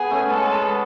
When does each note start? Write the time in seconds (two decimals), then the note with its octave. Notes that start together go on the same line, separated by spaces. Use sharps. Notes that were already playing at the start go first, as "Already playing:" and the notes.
Already playing: B3 G#4
0.10 A3 C#4
0.29 G#3 B3 A4
0.49 G#3